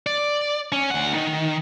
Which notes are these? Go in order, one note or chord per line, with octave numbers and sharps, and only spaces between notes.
D5
C#4
D2 F#5
D#3